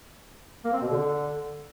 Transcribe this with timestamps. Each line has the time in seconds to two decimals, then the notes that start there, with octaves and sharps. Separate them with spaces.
0.64 A#3
0.73 C4
0.81 B2
0.90 D3